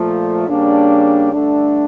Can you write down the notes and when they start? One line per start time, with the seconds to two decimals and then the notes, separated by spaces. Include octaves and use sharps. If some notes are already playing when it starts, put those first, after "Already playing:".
Already playing: A#2 F3 A3
0.49 C#3 G3 A#3 D4
1.32 G2 D3 A3 D4